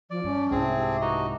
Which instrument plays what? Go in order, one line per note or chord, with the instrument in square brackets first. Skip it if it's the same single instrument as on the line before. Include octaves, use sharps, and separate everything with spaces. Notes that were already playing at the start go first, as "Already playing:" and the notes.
[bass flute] F3 [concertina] D5
[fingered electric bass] G2 [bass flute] C#4 [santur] D4 D#5
[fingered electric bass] C2 G#2 C3 [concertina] C4 G#4 [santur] E4 A4
[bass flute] G4 [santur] A4 E5
[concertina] D#4 F#4 D#5 [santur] B4